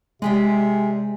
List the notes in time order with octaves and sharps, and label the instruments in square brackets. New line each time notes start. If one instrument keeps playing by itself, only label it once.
[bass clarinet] C3 [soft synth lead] G#3 [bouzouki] D4 G4 G#4